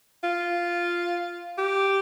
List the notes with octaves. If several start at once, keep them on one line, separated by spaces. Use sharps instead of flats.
F4
G4